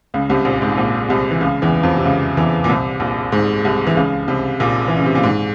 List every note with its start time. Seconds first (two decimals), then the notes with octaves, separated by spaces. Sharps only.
0.14 C#2 C#3
0.30 C2 C3
0.45 A#1 A#2
0.62 G#2
0.77 A#1 A#2
1.09 C2 C3
1.31 E3
1.41 C#2 C#3
1.62 E2 E3
1.83 F2 F3
1.97 C3
2.05 C#2 C#3
2.37 E2 E3
2.64 A#2
2.69 C2 C3
3.00 A#1 A#2
3.32 G#2
3.64 C2 C3
3.87 E3
3.96 C#2 C#3
4.28 C2 C3
4.60 A#1 A#2
4.88 E3
4.97 C#3
5.05 C3
5.15 A#2
5.23 G#2